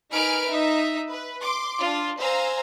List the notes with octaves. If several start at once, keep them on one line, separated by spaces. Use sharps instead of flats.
D#4 A#4 B4 G#5 F6 D7
D#4 E5
B4
C6 D6
D4 F4
C5 F5 G#5 A#5 E6